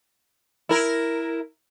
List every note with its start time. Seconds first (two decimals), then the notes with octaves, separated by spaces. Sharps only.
0.69 E4 A#4